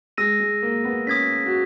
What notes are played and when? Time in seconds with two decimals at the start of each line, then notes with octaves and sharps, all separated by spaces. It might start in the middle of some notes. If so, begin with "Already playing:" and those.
0.18 G#3 E6 A#6 D#7
0.40 G#3
0.62 A#3
0.84 B3
1.07 C#4 D#6 G#6 B6
1.46 F#4